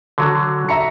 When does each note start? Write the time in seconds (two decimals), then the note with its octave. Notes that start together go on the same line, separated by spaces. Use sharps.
0.18 D3 F#3
0.69 E5 A#5 C#7